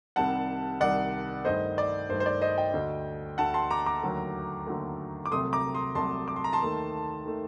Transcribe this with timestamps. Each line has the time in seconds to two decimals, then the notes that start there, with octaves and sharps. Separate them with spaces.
0.16 C2 C3 D#3 G3 F#5 A5
0.80 C2 C3 D#3 G3 D5 F#5
1.45 G2 D#3 A3 C5 D#5
1.78 D5
2.09 G2 D#3 A3 C5
2.20 C5
2.26 D5
2.41 C5 D#5
2.58 D#5 G5
2.73 D2 D3 A3
3.38 D2 D3 A3 F#5 A5
3.54 A5 C6
3.71 A#5 D6
3.86 A#5 D6
4.03 D#2 D3 F#3 A3
4.66 D#2 D3 F#3 A3
5.26 D6
5.31 C2 C3 F#3 A3 C6 D#6
5.53 A#5 D6
5.74 C6 D#6
5.95 C2 C3 F#3 A3 A5 C6
6.28 D6
6.36 C6
6.44 A#5
6.53 A5 C6
6.60 D#2 D#3 A3
7.26 D#3 A3